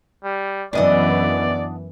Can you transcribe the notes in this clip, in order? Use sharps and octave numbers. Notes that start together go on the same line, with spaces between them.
G3
F#2 E3 B3 D4 D5 D#5 F#5